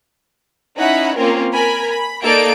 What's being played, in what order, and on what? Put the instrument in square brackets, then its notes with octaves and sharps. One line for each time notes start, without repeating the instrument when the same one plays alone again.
[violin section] C#4 D#4 E4 F#5 B5
A#3 C4 C#4 F4 A#4
A#4 G#5 B5
B5
A#3 D#4 A4 D5 D7